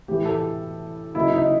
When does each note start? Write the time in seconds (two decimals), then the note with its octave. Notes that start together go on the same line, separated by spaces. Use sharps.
0.08 A2 E3 A3 G4
0.25 A4
1.15 C#3 F#3 A#3 D#4 E4
1.33 D#4